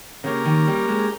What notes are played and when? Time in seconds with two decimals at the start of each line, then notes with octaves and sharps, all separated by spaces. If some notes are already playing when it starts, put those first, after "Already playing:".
0.23 C#3 A#3 C#4 G4 A#4
0.45 D#3
0.68 G3
0.88 G#3